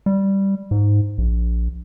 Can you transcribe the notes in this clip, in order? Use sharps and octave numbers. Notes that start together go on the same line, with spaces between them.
G3
G#2
A#1